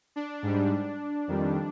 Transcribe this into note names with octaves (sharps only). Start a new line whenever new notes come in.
D4
G#2 G3
F2 D#3 G3